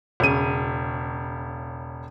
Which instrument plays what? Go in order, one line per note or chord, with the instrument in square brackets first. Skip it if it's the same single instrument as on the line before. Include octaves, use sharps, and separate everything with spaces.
[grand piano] E1 C#3 D#7